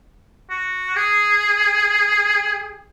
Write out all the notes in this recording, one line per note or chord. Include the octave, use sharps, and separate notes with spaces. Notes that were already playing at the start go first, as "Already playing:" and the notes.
F#4
G#4